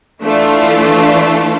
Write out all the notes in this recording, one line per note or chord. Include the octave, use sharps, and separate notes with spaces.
E3 A3 D4 F4